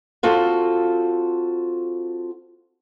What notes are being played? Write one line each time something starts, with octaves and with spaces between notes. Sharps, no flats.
C4 F4 F#4 A4